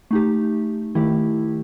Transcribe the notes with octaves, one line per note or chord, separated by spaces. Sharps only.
A3 D#4 G4
D#3 A3 E4 G4